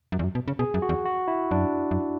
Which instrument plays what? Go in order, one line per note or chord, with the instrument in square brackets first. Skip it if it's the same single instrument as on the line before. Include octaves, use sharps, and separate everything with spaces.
[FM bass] F#2
E2
F#2
B2
C#3
[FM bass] B2 [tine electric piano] G#4
[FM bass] F#2
[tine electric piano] F#4
[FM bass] E2
[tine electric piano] F#4
E4
[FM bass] F#2 [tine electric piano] D4
[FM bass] F#2